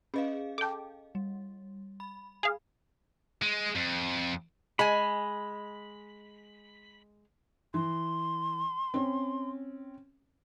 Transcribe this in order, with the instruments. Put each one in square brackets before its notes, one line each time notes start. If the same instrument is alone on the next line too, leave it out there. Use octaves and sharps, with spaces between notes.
[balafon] C#4 B4 [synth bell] G#4 D#5 F5
[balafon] A4 A5 [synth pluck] G5 D6
[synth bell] G3
B5
[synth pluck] G#4 F5
[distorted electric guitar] G#3
F2
[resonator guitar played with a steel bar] G#3 G#5 [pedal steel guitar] B5
[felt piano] E3 [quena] C6
[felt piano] C4 C#4